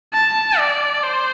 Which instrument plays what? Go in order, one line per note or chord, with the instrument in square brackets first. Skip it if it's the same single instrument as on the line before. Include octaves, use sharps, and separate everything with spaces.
[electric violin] A5
D5
C5